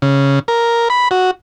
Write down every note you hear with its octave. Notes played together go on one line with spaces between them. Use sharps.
C#3
A#4
B5
F#4